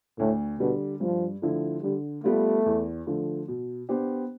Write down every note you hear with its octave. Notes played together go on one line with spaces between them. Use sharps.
D2 A2
B2 D3 G3
G2 F3
D3 F3 A3 E4
D3 G3
G3 A3 B3 F4
E2
D3 F3 A3
B2
B3 D4 G4 C5